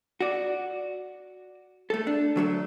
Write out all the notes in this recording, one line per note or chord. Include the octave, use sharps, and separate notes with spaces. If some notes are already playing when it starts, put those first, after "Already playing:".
F#4 D5
A3 A4
D4
D3 F#3 G#3 A3